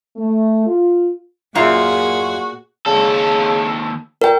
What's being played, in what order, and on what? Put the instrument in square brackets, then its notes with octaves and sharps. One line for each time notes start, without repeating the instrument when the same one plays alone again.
[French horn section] A3
F4
[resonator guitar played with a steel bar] F#2 F4 [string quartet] A#2 G#4 [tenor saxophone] F#4
[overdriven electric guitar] D#2 A4 [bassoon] C#3
[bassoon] A#2 [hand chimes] A#4 G5